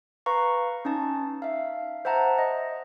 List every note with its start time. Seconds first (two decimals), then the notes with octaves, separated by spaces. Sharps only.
0.26 B4 F5 A#5 C#6
0.85 C#4 D#4 A5
1.42 E5 F5
2.05 C5 E5 F#5 A5 A#5
2.38 D#5